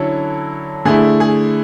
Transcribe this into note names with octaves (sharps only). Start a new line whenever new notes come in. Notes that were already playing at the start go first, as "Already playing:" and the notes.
Already playing: D3 F#3 C#4 E4 A4
D3 A3 E4 G#4
G#4